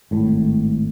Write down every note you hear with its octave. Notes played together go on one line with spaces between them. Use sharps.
G#1 A2